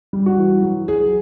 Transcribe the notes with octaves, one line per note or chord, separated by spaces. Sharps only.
G3
F#4
E3
F#3
F#3 G#4